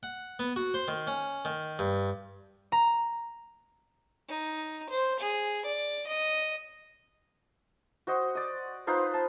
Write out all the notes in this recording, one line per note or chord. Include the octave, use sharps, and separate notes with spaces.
F#5
B3
F#4
C5
D#3
C#4
D#3
G2
A#5
D#4
C5
G#4
D5
D#5
F#4 C5 D#5
D5 D#5
D#4 F4 B4 C5
A5